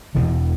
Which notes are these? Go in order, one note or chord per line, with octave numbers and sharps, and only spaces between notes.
E1 E2 B2 E3